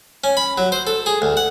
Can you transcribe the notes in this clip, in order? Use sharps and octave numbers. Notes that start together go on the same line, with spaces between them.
C#4
B5
F#3
C5
A4
G#4
D2
F#5